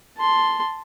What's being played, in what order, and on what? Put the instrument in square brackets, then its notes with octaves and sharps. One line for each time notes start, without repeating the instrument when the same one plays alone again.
[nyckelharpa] A5 C6